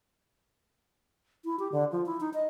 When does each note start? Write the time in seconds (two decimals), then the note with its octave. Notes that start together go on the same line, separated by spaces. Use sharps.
1.45 E4
1.59 G4
1.72 D3
1.92 F3
2.06 E4
2.20 D#4
2.34 D#5